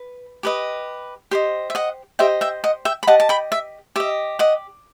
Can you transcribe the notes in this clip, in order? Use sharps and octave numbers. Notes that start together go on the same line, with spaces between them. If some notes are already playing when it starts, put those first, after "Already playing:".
Already playing: B4
G4 B4 D#5
G4 C5 D#5
E5
D#5 F#5
G4 C5 D#5 E5 G5
E5 G5
D#5 F#5
E5 G5
B5
G4 D#5 F#5 A5
A5
G5 B5
E5
G4 D#5 E5
D#5 F#5